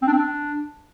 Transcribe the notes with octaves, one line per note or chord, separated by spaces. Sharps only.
C4
D4
C4
D4